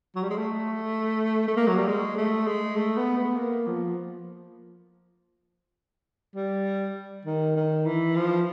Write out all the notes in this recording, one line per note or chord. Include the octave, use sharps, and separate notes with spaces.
F#3
G3
G#3
A3
A3
A#3
F#3
G3
G#3
A3
G#3
A3
B3
B3
A#3
F3
G3
D#3
D#3
E3
F3